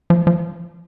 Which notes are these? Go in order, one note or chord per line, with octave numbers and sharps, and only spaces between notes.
F3
F3